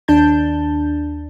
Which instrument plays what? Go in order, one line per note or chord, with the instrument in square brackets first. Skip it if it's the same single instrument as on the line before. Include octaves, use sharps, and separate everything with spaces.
[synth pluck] D#2 D4 A5 G6